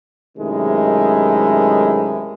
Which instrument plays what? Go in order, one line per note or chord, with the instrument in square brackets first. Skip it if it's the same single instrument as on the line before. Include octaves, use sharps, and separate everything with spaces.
[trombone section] F#2 C3 D#3 G#3 A3 E4